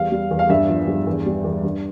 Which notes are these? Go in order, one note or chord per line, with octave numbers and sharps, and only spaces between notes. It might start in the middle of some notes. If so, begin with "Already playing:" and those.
Already playing: E2 G3 F5
G3
E2
F5
G2 E5
F3
G2
E2
G3
E2
G2